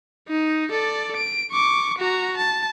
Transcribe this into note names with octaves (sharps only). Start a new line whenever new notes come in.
D#4
A4 D5
D7
C#6 D6
F#4 A#5
A5